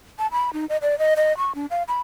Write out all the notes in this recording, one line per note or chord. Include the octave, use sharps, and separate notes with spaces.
A5
B5
D#4
D#5
D5
D#5
D#5
C#6
D4
F5
B5